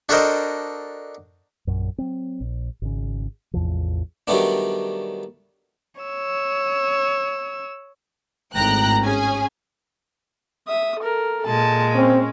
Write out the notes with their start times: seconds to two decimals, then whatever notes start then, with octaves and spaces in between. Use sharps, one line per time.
0.09 D4 F#4 A4 A#4 C5 D#5
1.67 A#1 F#2
1.98 F#3 C4
2.41 A#1
2.82 G#1 C#3
3.54 A1 E2 C3 F3
4.27 D#3 F#3 G3 A3 B3 D4
6.01 C#5 E6
8.55 G#1 A2 G5 A#5 F#6
9.03 C#4 G#4 G#5
10.67 E5 D#6
10.99 A4 A#4
11.46 A#2 G#3 A5
11.95 C4 C#4